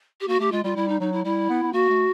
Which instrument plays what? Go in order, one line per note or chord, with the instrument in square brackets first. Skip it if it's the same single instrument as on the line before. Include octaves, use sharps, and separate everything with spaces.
[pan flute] G4
[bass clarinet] A#3 [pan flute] F#4
[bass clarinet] A3 [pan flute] G4
[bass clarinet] G#3 [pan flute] F4
[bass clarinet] G3 [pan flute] F4
[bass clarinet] G3 [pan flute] E4
[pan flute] D#4
[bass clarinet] F#3 [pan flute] D#4
[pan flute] E4
[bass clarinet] G3 [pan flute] E4
[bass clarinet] B3
B3
[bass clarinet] A#3 [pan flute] F#4
[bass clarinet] A3